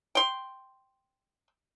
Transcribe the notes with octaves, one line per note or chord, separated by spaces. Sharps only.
G5 C6